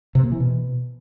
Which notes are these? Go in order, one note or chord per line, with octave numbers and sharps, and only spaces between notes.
C3
A#3
E3
B2